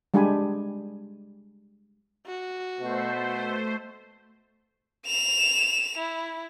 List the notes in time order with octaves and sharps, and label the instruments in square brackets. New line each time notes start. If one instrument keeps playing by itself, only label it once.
[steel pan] G3 G#3 D4 G4 G#5 B5
[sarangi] F#4
[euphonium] B2 [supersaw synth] A3 C5
[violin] E7 F7
E4